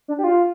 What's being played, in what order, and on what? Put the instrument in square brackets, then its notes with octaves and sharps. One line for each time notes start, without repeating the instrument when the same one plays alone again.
[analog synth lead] D4
G4
F4